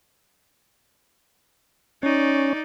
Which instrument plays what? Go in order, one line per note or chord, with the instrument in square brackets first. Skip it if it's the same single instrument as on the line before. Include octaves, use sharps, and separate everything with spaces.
[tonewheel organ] C#4 [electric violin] D#4 D5